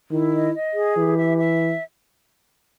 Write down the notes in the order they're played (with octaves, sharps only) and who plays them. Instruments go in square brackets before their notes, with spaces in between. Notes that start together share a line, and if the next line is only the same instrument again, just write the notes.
[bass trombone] D#3 [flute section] E4
[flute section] D#5
D#5
G#4
[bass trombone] E3 [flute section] G4
[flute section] E5
E5